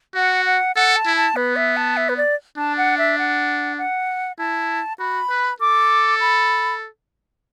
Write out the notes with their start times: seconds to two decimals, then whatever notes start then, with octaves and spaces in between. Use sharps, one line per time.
0.15 F#4 F#5
0.45 F#5
0.76 A4 F#5
0.96 A5
1.06 E4
1.16 A5
1.36 B3 B4
1.56 E5
1.77 A5
1.97 E5
2.09 B4
2.17 D5
2.57 D4 A5
2.77 F#5
2.98 E5
3.18 F#5
3.78 F#5
4.38 E4 A5
4.99 F#4 B5
5.30 B4
5.60 A4 D6
6.20 B5